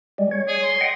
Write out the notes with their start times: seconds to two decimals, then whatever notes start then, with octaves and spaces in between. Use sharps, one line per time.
0.18 G3 G#3
0.31 C#5
0.48 G#4
0.63 C6
0.81 D#5 F#5 G5